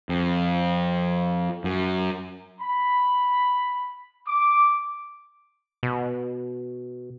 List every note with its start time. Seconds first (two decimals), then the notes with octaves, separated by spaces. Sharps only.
0.09 F2
1.64 F#2
2.61 B5
4.27 D6
5.83 B2